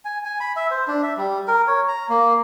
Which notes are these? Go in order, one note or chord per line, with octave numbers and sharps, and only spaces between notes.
G#5
G#5
B5
E5
C5
D4
E5
G3
A#4
C#5
A#5
A#3